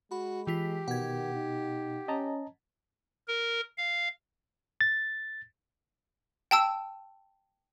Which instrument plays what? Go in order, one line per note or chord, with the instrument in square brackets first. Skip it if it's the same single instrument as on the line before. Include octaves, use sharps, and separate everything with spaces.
[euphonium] G#3 [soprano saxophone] F#4 [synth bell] B5
[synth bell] E3 F4 B6 [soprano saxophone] G4
[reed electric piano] B2 [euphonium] D#3 [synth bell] F#5 G#6
[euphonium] D#4
[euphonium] C#4 [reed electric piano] D#5 A5 A#5
[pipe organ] A#4
F5
[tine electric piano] A6
[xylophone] G5 A5 E6